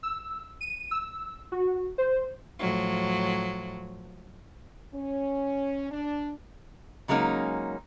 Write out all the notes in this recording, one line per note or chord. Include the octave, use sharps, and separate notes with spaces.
E6
D#7
E6
F#4
C5
A2 F3 F#3
C#4
D4
C#3 F#3 G#3 A#3 C#4 D#4